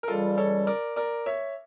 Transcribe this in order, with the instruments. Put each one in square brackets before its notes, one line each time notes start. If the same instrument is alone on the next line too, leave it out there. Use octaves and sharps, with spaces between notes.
[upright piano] A#4
[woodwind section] C#2 C#3 E3 G3 [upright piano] F4 A4
[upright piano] A4 C#5
A#4 D5
A#4 D5
C#5 E5